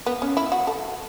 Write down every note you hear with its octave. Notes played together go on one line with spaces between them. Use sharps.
B3
C#4
E4
F#4
A4